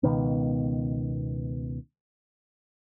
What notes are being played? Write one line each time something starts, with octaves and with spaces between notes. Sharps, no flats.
C#2 B2 D#3 B3